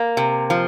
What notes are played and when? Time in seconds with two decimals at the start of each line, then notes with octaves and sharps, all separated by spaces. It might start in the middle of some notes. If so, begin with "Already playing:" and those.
Already playing: A#3
0.17 C3
0.50 F3